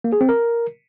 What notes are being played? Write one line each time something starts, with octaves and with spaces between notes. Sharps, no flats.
A#3
G#4
C4
A#4